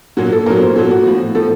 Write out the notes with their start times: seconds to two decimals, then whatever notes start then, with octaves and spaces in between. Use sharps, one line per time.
0.17 A#2 F#3 F#4
0.32 A4
0.46 A#2 F#3 A#4
0.61 C5
0.76 A#2 F#3 A4
0.91 F#4
1.05 A2 F3
1.35 A2 F3 A4